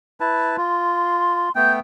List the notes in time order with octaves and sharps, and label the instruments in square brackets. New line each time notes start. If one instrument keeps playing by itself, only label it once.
[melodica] E4 B4 A5
[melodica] F4 [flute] C6
[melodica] A3 B3 G5 [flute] G6